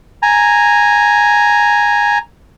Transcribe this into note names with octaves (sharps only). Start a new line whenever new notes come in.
G#5 A#5